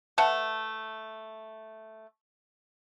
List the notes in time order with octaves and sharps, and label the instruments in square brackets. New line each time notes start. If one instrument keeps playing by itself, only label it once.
[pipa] A3 B4 F#5 A5